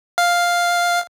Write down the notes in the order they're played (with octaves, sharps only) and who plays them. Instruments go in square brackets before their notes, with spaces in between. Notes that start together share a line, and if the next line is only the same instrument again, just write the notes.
[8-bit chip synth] F5